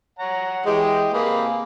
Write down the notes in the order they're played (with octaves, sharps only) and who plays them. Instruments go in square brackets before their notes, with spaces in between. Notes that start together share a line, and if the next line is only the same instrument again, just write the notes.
[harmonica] C#5 F#5 A#5
[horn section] E3 G#3 [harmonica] G4 G5
[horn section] C3 A#3 [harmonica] G#4 B4